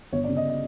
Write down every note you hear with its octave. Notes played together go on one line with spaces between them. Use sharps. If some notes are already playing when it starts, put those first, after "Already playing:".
G1 C#5
D5
C#3
D#5
D#5